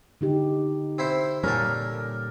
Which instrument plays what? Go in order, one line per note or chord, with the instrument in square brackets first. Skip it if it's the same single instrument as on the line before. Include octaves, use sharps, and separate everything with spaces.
[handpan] D3 D#4 G4
[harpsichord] C4 E4 C5
[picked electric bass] A#2 G3 [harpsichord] C#4 A4 [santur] A#4 D5 G5